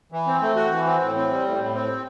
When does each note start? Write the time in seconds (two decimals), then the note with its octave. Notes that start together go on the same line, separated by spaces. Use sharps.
0.12 E3
0.27 C4
0.42 A3
0.56 F#4
0.71 E3
0.86 C4
1.01 A2
1.15 C4
1.31 G3
1.45 A2
1.59 A2
1.74 C4